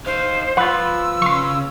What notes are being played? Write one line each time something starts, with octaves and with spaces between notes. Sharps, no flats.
D#4 C5 F5
F3 F4 B4 F#5 E6
C#3 F5 C6 C#6